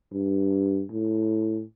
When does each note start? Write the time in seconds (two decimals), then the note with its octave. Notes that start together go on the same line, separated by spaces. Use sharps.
0.13 G2
0.92 A2